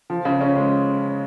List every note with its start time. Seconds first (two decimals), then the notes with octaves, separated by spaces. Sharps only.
0.10 F3
0.25 C#3
0.41 C#4
0.56 G#3